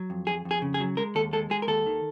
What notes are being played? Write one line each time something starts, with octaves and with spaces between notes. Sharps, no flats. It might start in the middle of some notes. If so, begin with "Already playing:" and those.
Already playing: F#3
F2
F2 G#4
F2
G#4
C#3
G#4
F#3
G#3 A#4
D#2 A4
G#3 A4
G#3 G#4
A#4
D#2 A4
D#3